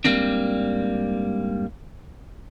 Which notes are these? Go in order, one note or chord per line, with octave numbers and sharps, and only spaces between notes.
G#2 G3 A3 A#3 C4 D4